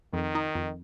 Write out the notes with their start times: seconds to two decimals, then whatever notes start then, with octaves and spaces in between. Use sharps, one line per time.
0.13 F2 D#3
0.35 D#4
0.55 F2